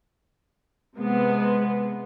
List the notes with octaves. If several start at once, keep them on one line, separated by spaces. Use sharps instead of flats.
C3 G#3 B3